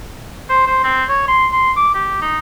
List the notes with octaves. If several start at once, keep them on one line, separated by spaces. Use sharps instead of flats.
C5
C5
C4
C#5
C6
C6
D6
G4
D#4